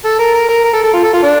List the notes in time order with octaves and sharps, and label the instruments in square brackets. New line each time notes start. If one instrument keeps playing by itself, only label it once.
[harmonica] A4
A#4
A#4
A#4
A#4
A4
A4
F4
A4
F4
D4